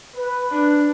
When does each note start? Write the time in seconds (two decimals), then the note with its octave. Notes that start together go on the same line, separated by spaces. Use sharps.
0.16 B4
0.51 D4